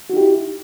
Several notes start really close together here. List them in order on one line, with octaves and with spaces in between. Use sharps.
F#4 D#4 G4 E4